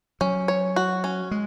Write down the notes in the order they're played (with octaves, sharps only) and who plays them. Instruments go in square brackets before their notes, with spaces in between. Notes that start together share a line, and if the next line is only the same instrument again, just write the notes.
[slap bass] F#3 [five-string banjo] C#4
[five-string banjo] C#5
F#4
C#4
[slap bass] G#3